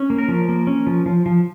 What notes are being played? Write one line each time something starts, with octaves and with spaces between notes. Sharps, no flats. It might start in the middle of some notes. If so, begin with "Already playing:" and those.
Already playing: C#4
A#3
A#4
F3
A#3
C#4
F3
F3
F3